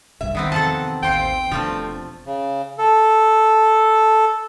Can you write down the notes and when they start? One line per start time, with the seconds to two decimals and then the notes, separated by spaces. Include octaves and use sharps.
0.21 F#1 C2 G2 E5
0.35 D#3 B3 C4
0.52 E2 C3 F3 A4 F#5 A5
1.03 A1 D#2 G4 C5 F5 G5
1.51 E1 B2 F3 G3 A3 C4 D4
2.26 C#3
2.78 A4